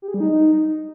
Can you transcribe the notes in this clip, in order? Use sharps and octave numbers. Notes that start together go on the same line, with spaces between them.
G4
G#4
G3
D#4